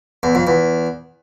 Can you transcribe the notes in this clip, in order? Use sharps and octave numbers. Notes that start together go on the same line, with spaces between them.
E2
F2
E2